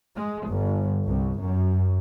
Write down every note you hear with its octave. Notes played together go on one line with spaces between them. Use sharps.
G#3
G1
C2
F#2